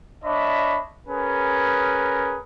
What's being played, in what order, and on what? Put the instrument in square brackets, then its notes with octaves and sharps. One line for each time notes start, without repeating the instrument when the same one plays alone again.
[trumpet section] D4 C#5 D#5 E5 B5
C#4 G#4 A#4 B4